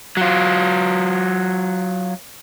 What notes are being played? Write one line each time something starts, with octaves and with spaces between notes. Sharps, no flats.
F#3 F4